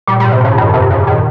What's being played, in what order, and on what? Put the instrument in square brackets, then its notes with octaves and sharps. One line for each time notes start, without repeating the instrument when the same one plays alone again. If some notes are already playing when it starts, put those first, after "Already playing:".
[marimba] A#2 [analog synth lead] G3
[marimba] G#2 [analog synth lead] G3
[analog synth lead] C3
[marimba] G#2 [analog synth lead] C#3
[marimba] F2
[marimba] G2 [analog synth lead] D#3
[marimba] F2 [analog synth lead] C3
[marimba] G2
[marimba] G#2 [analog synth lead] C#3
[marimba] A#2
[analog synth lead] D#3